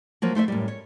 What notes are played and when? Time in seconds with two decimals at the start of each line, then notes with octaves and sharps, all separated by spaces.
0.22 F3 F#3 A#3
0.35 A3 C5 C#5 E5
0.48 F#2 A2 G3
0.68 C#5